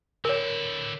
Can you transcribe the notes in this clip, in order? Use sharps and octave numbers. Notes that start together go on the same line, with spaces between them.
D3 E4 A#4 C#5